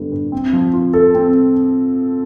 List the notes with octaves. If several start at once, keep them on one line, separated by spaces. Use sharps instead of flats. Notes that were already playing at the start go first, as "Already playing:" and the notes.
Already playing: G2 D3 G3 B3
G2
C4
F3
F4
A4
C4